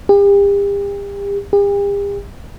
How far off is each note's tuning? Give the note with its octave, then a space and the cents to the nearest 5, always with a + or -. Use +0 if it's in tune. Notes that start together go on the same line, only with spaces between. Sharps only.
G4 +40
G4 +45